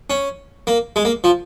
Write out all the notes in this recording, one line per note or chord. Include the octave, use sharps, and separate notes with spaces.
C#4
A#3
G#3
A#3
F3